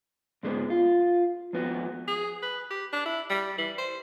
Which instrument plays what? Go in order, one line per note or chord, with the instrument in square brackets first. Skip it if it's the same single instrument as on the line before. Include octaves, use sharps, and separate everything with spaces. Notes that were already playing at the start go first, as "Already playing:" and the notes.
[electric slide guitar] G#2 G#3 B3
F4
F2 B3 F#4
[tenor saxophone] G#4
B4
G4
D4
E4
G3
E3
C5